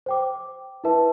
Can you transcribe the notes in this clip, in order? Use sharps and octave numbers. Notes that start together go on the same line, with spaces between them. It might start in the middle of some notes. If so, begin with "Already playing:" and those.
C5 G5 D6
E4 B4 E5 A5